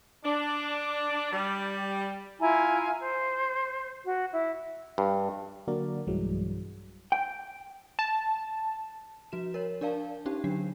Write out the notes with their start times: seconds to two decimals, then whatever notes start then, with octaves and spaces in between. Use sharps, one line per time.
0.24 D4
1.32 G3
2.40 E4 F4 G#5 A#5
2.99 C5
4.03 F#4
4.33 E4
4.98 G2
5.68 D3 F#3 A#3 F#4 A#4 D5
6.07 B1 G2 E3 F#3 G#3
7.12 G5
7.99 A5
9.32 F3 F#4 E7
9.54 A#4 C#5
9.81 D4 A#4 D5 F5 A5
10.26 C#4 D#4 G4
10.44 D3 F#3 D4 C7